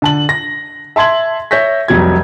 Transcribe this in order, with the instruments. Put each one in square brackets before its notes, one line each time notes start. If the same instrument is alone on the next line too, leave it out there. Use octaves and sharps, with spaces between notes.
[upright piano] D3 A5 F#7
A#6
E5 A5 C6 G#6 F#7
C#5 E5 G6 A#6 B6
F1 C2 F2 F#3 G#6